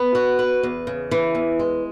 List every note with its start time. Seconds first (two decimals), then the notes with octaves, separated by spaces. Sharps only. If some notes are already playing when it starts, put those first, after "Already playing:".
Already playing: B3
0.15 F#4
0.39 B4
0.63 E2
0.87 C#3
1.11 E3
1.35 E2
1.59 G#3